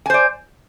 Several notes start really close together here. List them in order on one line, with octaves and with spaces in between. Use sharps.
G#5 C5 D5